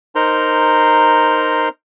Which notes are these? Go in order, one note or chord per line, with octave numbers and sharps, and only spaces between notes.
D#4 A#4 C5 A#5 C6